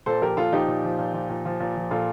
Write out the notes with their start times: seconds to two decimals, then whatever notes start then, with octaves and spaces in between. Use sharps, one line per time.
0.06 A#2 A4 C5
0.22 F3 G4 A#4
0.37 A#2 F4 A4
0.52 F3 D#4 G4
0.68 A#2
0.83 F3
0.99 A#2
1.14 F3
1.29 A#2
1.45 F3
1.60 A#2
1.76 F3
1.91 A#2 F4 A4